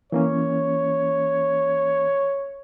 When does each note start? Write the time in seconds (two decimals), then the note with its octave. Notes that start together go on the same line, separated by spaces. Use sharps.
0.12 E3 A#3 C#4 C#5